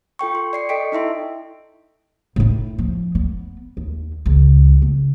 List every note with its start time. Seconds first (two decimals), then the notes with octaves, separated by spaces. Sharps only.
0.19 F4 A4 G5 C#6
0.35 C6
0.53 D5 C7 C#7
0.69 A4 D#5 G5 C#6 B6 D7
0.92 D#4 E4 E5 C6
2.36 A2 E4
2.79 F3
3.15 B3
3.77 D#2
4.26 C#2
4.82 C#3